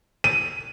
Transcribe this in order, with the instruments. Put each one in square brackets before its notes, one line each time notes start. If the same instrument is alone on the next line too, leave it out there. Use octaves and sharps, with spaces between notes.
[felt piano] D#7